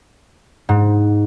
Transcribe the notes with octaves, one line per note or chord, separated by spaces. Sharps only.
G#2